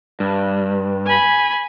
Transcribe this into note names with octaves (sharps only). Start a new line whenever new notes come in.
G2
G#5 B5